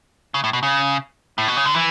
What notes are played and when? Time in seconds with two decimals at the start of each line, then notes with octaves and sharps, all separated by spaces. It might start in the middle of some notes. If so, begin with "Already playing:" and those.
0.34 C#3
0.44 A2
0.53 B2
0.63 C#3
1.38 A2
1.48 B2
1.57 C#3
1.66 D3
1.75 E3